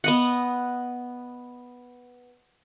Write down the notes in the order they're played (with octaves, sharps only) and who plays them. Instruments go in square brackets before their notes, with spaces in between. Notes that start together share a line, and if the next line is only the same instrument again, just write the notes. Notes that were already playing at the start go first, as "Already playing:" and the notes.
[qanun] B3 D#5 F#5